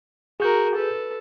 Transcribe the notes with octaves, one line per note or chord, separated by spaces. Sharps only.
F#4 G#4 A#4 G6
A4 B4